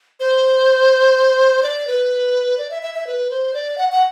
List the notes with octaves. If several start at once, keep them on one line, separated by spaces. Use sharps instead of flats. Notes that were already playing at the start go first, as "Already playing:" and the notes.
C5
D5
B4
D5
E5
E5
E5
B4
C5
D5
F#5
F#5